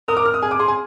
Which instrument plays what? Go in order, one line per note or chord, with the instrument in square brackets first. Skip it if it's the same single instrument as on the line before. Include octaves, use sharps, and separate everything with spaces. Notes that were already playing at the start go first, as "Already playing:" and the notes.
[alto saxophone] A#4 [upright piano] D#6
[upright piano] D6
F6
D#6
[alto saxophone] G#4 [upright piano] G#5
[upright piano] D6
[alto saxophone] G#4 [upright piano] C6
[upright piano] G#5